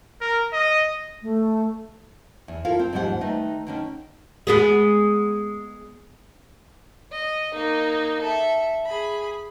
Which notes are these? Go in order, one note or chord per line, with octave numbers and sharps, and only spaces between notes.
A#4
D#5
A3
E2
E4 F4 A4 A#4 F5
C4
D#2 G#2 F3 G3 C5 F#5
D#3 A3 D#4 B4
D3 D#3 C#4
G#3 B3 G#4
D#5
A#3 D#4
A4 E5
G#4 B5